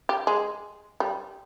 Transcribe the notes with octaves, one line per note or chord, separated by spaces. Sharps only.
G4
G#3
G3